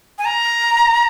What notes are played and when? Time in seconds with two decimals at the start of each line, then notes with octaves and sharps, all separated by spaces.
0.18 G#5
0.25 A#5